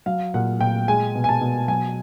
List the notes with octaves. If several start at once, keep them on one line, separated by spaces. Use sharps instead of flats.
F#3 F5
A#2 F#5
A#2 G5
G#3 G#5
B2
G#5
A5
B2
F#3 G#5